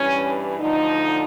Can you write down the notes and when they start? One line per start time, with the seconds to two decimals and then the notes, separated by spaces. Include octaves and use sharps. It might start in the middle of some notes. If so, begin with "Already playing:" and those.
Already playing: G2 E3 C#4
0.59 D2 D3 F3 D#4